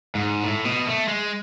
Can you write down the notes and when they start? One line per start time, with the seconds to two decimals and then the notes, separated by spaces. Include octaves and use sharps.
0.15 G#2
0.43 A2
0.65 B2
0.87 A3
1.08 G#3